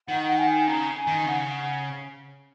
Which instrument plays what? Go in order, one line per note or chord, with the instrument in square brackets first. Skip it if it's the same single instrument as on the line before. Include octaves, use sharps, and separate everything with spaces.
[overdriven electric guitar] D#3 [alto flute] F#5
[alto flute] F#5
G#5
[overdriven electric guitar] C#3 [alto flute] A#5
[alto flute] G#5
[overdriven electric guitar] D#3
[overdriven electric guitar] C#3 [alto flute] F#5